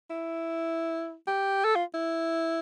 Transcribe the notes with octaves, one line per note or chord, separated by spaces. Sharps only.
E4
G4
A4
F4
E4